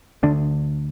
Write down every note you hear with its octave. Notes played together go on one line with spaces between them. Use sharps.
D2 D3 D4